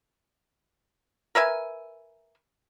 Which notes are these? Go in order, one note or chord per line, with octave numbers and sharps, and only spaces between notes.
A#4 B4 E5 G#5